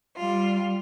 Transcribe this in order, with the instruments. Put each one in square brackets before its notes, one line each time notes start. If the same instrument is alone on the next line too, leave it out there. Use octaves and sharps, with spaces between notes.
[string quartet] G3 F4